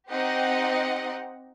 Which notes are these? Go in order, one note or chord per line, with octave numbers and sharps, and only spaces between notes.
C4 D#4 G4 D#5 F#5